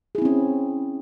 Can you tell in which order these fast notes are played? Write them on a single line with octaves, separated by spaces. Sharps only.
G#4 E4 C4 C#4